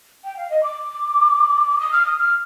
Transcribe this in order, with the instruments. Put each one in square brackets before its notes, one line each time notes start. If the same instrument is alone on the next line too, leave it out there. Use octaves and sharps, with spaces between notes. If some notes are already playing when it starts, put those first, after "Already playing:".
[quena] G5
F5
D#5
D6
D#6
F6
D#6
F6